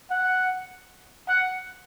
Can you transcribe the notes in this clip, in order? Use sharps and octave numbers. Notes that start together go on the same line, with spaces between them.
F#5
F#5